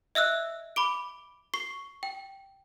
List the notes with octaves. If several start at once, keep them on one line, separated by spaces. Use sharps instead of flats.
D#5 E5 E6 F#6
B5 D6 D7
C#6 C7
G5